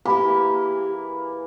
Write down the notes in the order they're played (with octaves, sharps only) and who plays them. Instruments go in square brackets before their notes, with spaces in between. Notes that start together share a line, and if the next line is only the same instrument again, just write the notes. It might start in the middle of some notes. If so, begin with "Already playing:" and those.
[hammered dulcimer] E3 A#3 G#4 [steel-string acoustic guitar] E4 G4 [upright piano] B5